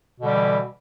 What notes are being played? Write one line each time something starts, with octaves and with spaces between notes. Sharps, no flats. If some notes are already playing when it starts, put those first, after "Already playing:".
B2 D3 E3 G3